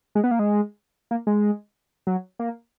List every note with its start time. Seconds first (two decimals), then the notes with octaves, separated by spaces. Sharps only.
0.15 G#3
0.24 B3
0.31 A#3
0.39 G#3
1.11 A#3
1.27 G#3
2.07 F#3
2.39 A#3